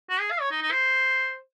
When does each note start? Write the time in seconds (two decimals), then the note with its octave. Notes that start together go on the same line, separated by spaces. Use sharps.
0.10 F#4
0.20 G#4
0.31 F5
0.41 C#5
0.51 D#4
0.62 D#4
0.71 C5